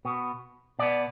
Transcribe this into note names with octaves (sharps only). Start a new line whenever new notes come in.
B2 B3
B2 B3 D5